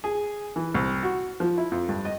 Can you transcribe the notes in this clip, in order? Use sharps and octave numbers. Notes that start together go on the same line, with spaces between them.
G#4
E3
C2
F#4
F3
E4
F2
G2
D#5